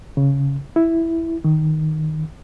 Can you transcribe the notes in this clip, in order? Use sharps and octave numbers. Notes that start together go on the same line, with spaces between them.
C#3
E4
D#3